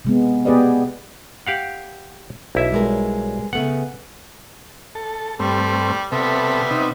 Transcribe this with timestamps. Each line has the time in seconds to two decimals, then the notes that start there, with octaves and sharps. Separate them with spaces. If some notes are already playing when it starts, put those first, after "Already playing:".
0.05 C3 G#3 B3
0.45 B3 G4 G#4 B4 D5 D#5
1.47 G4 F5 F#5
2.55 B1 E4 E5
2.72 G3 G#3 A#4
3.53 C#3 A3 B3 F#5
4.95 A4
5.40 G2 G3 A3 C4
6.12 C3 G3 B3 A4 E5
6.71 C3 D#4